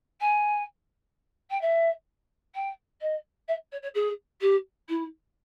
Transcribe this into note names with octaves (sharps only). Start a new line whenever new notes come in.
G#5
G5
E5
G5
D#5
E5
C#5
C#5
G#4
G4
E4